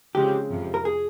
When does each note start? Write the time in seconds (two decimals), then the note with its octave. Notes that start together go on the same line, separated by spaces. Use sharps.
0.15 C#3 F3 G#3 C4 G4
0.50 F2 C3 F3
0.74 A#4
0.85 G#4